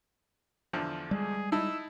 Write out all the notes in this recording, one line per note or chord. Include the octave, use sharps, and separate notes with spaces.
E2 D3 F3
G3 G#3 G#4
D#4 E4 A5 E6